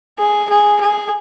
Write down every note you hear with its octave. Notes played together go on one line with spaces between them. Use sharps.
G#4
G#4
G#4